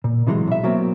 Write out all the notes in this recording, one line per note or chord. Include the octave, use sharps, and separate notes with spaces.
A#2
A2 C3 E3 F#3 G#3
B1 E5
B2 F#3 A#3 C4